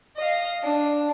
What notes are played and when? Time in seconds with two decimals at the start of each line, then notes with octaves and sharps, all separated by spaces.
0.17 D#5 F5
0.63 D4